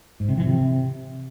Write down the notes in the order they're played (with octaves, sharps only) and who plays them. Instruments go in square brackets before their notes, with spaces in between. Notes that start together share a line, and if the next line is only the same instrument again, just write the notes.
[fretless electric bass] G#2
C3
E3
C3